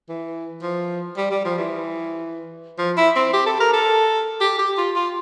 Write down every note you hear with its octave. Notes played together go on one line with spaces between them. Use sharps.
E3
F3
G3
G3
F3
E3
F3
E4
C4
G4
A4
A#4
A4
G4
G4
F4
F4